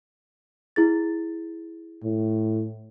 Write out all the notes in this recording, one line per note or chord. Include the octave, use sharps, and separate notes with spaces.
E4 G#4 A6
A2